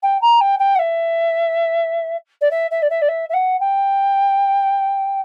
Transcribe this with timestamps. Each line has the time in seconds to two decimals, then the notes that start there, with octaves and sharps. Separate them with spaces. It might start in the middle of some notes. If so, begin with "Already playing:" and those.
0.03 G5
0.21 A#5
0.40 G5
0.59 G5
0.75 F#5
0.79 E5
2.41 D5
2.50 E5
2.71 E5
2.82 D5
2.90 E5
3.01 D5
3.08 E5
3.29 E5
3.33 F#5
3.60 G5